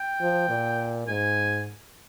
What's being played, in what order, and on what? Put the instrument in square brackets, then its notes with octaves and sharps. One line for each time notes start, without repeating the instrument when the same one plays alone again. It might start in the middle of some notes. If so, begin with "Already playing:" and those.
Already playing: [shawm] G5
[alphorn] F3
A#2
[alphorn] G#2 [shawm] G#5